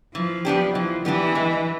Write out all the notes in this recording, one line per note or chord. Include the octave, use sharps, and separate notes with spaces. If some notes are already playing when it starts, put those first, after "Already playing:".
E3 F3
G3 B3 D4 G4
E3 F3
E3 G3 B3 D4 G4
G#3